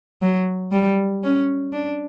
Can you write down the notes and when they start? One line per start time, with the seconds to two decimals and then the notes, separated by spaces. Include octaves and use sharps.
0.22 F#3
0.72 G3
1.24 C#4
1.73 D4